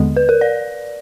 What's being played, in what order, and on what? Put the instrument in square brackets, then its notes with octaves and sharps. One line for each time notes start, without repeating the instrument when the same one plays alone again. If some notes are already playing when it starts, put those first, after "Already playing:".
Already playing: [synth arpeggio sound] D#2 D3 G#3 B3
[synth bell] B4
A#4
D5